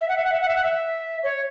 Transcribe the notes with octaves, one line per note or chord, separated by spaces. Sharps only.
E5
F#5
E5
F#5
E5
F#5
E5
F#5
E5
C#5